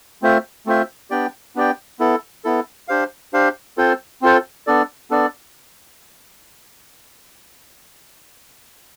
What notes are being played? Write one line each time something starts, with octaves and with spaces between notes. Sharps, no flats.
A3 C4 F4 C5 E5
A3 C4 F4 C5 E5
B3 D4 G4 D5 G5
B3 D4 G4 D5 G5
B3 E4 A4
B3 E4 A4
D4 G4 C5 F5
D4 G4 C5 F5
C4 F4 A4 C5
C4 F4 A4 C5
B3 D4 A4 D5
B3 D4 A4 D5